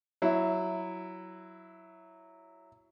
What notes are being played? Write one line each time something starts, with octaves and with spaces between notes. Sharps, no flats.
F#3 E4